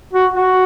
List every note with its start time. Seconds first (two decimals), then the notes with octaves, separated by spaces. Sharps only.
0.13 F#4
0.34 F#4